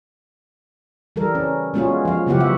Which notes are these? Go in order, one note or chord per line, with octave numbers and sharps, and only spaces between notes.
E3 G3 A4 A#4
C#4
G#3 B3 C#4 F4 F#4 G#4
F3 F5
C#3 F#3 B3 E4 G4 F#5
F#3 F#4 E5 F#5